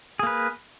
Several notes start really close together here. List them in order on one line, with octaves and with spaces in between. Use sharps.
G#4 A#3 B4